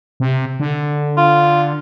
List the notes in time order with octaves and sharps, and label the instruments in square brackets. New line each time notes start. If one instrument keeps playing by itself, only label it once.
[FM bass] C3
D3
[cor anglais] F4